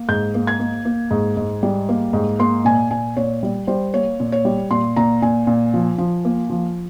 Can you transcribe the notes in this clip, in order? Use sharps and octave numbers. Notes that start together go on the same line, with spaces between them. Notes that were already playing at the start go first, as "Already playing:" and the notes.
Already playing: A#3
G#2 G6
A#3
G#6
A#3
A#3
G#2
G#2
G3
A#3
G#2
A#3 C6
A#2 G#5
A#2 G#5
A#2 C#5
G3
G3 C5
A#3 C#5
A#2
C#5
G3
A#2 C6
A#2 A#5
A#2 G#5
A#2
F3
F3
A#3
F3